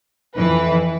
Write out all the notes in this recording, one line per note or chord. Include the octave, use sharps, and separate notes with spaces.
F2 E3 B4